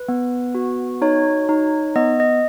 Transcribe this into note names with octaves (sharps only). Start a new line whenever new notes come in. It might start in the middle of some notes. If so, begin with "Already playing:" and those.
Already playing: B4
B3
F#4
D#4 C#5
D#4
B3 D#5
D#5